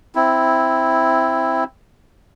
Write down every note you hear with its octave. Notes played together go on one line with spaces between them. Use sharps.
C4 E4